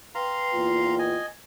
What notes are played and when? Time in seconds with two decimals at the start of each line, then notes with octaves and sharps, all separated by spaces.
0.15 B4 F5 G5 A#5 C6
0.54 E2 A#2 F4
0.99 D#5 G#5